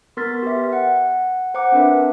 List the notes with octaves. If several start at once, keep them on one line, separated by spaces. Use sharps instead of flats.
B3 A#4 C6 F6 A6 B6
G4 B4 E5
F#5
C5 F#5 A#5 D6
C4 D4 A#4 B4 E5